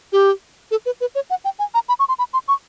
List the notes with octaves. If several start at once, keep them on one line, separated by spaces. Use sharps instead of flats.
G4
A4
B4
B4
C#5
F#5
G5
G#5
A#5
B5
C#6
C6
B5
C6
C#6